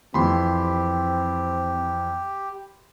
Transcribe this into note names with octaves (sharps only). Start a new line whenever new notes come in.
F2 E3 C4 G4 B5 C6